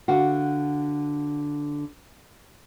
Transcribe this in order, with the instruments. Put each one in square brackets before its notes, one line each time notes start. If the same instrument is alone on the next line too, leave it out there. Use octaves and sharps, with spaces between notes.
[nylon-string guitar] D3 F#4 F5 F#5